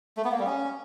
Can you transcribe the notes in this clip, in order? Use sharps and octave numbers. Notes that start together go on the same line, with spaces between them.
A3
B3
A#3
G3
C#4